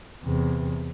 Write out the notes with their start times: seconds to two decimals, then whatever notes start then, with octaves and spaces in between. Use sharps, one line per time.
0.24 E2 C3